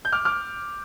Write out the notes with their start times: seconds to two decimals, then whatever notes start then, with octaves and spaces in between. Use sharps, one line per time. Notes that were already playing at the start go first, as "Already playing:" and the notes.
0.05 G6
0.12 D6 F6
0.25 D6 F6